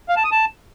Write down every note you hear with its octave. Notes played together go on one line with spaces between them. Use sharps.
F5
A5
D#6
A5